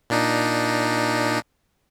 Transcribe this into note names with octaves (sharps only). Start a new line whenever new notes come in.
A#2 D4 D#4